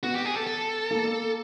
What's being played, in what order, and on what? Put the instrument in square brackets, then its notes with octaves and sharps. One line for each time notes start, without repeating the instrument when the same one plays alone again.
[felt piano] B3 [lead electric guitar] F#4
[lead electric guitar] G4
G#4
A4
A4
[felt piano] A#3